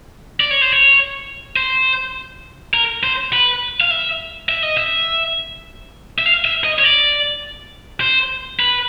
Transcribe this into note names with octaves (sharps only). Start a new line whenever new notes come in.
D5
C#5
C5
C#5
C5
A#4
C5
B4
F5
E5
E5
D#5
E5
E5
F5
E5
D#5
C#5
D5
C5
B4